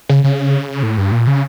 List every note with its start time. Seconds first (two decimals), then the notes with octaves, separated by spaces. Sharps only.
0.09 C#3
0.24 C#3
0.83 A2
0.98 G2
1.12 A#2
1.27 C#3